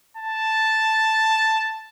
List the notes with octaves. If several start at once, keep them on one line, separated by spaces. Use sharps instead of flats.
A5